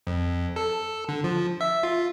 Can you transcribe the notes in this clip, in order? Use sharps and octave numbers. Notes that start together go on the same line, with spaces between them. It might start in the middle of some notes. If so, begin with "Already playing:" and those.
F2
A4
D3
F3
E5
F4